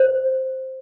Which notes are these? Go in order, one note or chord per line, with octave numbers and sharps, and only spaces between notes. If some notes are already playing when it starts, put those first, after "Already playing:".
Already playing: C5